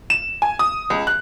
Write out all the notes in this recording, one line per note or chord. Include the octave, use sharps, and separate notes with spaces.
E7
G#5
D#6
C#2
F#6